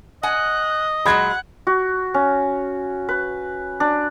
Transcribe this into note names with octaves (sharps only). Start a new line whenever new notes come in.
D#5 F#5 G#5 F#6
A#2 F#3 G#3 F#5 B5 G#6
F#4
C#4
B4
D4